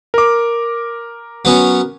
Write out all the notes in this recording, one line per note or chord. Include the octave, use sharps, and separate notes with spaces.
A#4 D6
F#3 B3 C#4